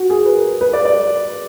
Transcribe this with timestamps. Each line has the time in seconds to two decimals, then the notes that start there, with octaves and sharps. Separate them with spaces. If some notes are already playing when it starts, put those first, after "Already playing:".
Already playing: F#4
0.10 G#4
0.26 B4
0.36 A#4
0.61 B4
0.73 D5
0.85 D5